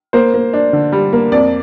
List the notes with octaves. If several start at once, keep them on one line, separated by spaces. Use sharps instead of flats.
A#3 C5
A#3
D4
D3
G3
A#3
F2 D5